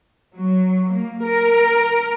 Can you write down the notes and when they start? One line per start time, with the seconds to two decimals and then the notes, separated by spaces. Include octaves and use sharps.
0.35 F#3
0.91 A#3
1.23 A#4